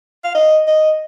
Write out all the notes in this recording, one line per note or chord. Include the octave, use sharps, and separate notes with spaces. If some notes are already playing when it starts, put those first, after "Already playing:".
F5
D#5
D#5